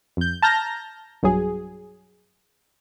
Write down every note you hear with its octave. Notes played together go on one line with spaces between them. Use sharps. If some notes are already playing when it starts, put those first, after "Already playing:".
F2 G6
A5 A#5 F6 G6 A#6
B1 G2 F#3 G#4